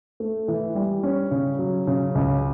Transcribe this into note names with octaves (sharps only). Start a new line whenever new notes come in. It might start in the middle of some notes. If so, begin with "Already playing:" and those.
A3
E3
G3
C#4
C#3
F#3
C#3
C#2